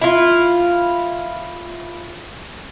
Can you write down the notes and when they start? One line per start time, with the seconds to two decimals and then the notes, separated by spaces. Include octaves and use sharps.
0.01 E4 F4